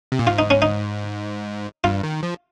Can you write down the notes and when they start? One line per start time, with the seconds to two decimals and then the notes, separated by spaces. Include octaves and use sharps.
0.12 C3
0.19 A#2
0.27 G#2 F4
0.39 D#4
0.50 C#4
0.62 D#4
1.84 G2 F4
2.03 D#3
2.23 F3